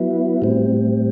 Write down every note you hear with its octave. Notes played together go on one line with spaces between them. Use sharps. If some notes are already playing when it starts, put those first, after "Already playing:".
Already playing: F#3 B3 E4
A2 G3 C4